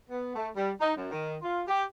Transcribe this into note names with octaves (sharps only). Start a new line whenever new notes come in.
B3
A3
G3
D#4
F#2
D#3
F4
G4